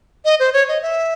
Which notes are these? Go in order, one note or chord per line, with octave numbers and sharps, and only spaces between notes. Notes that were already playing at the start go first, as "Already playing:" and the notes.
D#5
C5
C#5
D#5
E5